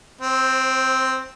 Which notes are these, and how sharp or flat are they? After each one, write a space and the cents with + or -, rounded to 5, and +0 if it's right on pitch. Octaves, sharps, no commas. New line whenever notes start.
C4 +0 C5 +25